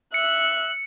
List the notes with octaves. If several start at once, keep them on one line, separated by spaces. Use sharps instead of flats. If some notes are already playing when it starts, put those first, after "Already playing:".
E5 F#6 C#7